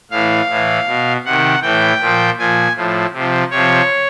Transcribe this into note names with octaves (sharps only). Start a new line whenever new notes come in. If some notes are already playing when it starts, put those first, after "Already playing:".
A2 E3 F5
A2 E3
B2
C3 D#3 F#5
A2 E3 G5
A#2 F3
A#2 F3 G#5
A2 F3
C3 F3
C3 F3 C#5